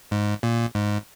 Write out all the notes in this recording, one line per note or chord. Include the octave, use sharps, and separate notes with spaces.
G#2
A#2
G#2